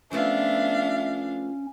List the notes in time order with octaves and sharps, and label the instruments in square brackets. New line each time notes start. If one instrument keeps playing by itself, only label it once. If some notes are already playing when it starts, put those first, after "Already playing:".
[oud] F3 A3 B3 [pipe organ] C#4 [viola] D4 F5 [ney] E5